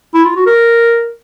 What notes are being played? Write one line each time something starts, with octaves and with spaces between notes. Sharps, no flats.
E4
F4
F#4
A#4